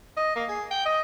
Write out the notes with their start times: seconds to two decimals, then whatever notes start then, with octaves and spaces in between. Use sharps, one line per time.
0.17 D#5
0.35 A#3
0.49 G#4
0.71 G5
0.85 D#5